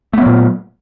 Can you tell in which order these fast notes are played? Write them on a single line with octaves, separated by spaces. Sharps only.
A3 B3 F#3 A#2